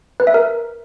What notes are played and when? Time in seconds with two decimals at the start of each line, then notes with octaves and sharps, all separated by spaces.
0.20 B4
0.27 E5
0.34 A#4